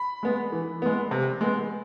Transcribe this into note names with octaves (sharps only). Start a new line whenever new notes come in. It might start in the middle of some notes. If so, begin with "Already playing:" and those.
Already playing: B5
G#3 B3
E3
G#3 B3
C3
G#3 B3